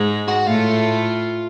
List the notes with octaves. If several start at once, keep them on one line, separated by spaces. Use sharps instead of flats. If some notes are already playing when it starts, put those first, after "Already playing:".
Already playing: G#2 G#3
F#4
A2 A3 F4